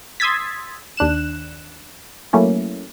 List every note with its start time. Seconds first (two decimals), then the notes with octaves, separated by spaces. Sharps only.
0.20 C6 D#6 E6 G#6 A6 B6
0.97 D#2 D4 F#6 E7
2.33 F#3 A3 A#3 C#4 E4